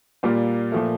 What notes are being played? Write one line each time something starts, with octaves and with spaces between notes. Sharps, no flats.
A#2 G3 A#3 F4
A#2 F3 A3